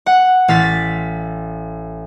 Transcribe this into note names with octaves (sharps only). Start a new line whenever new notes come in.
F#5
A1 F5 A6 B6